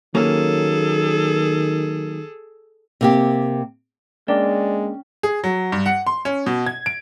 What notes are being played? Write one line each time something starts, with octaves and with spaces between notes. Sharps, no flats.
D#3 F#3 A#3 C#4 G#4 A4
C3 A#3 G4
G#3 A#3 C#4 D4 D5 G5
G#4
F#3
G2
F#5
C6
C#4
B2
G#6
D7